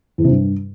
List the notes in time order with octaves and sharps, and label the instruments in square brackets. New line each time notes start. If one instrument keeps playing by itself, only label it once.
[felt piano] E2
C3
G2